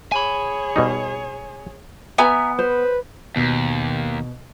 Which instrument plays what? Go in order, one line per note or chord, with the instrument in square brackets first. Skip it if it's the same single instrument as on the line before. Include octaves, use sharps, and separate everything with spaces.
[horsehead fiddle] G#4 C#5 [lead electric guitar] G#5 B5
[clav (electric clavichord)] B2 G3 D#4
[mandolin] B3 [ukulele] E5 G#5 A#5
[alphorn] B4 [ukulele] C5
[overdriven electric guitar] D#2 [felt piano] B2